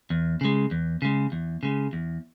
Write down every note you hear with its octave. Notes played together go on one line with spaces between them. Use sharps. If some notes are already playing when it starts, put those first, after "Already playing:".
E2
C#3 G#3
E2
C#3 G#3
E2
C#3 G#3
E2